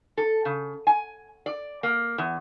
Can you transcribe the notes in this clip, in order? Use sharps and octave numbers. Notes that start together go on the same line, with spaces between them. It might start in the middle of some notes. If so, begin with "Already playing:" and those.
A4
C#3
G#5
D5
A#3
E2